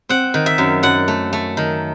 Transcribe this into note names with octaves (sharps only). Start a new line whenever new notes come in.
C4 F#5
D#3
E5
F#2
F#2 F#5
A3
A3
D#3